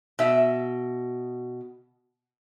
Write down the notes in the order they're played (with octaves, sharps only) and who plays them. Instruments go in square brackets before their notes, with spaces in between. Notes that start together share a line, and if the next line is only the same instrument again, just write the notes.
[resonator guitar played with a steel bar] B2 E5